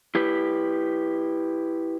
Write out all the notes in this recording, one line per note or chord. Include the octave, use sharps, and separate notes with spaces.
E4 G4 B4